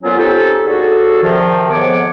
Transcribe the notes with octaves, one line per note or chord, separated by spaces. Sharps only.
F2 A#2 F#3 B3 C#4 F4
C4 C#4 D#4 G4 A4
D#2 D3 F#4 G#4 A4
C3 D#3 F3
F2 G#2 B3 C#5 D6